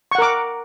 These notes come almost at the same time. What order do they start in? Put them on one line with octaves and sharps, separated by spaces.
C#6 F#5 A#4 D6